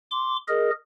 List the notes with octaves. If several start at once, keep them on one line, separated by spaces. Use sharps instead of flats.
C6 D6
G#4 A#4 D#5